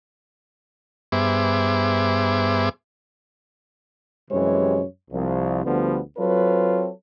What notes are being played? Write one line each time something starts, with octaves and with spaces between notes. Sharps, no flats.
G2 B3 G#4 C5 E5 D6
F#2 C3 E3 G3 G#3 C#5
C2 F3
D2 D3 F3 G3 B3
F#3 C4 F4 A4 B4 C#5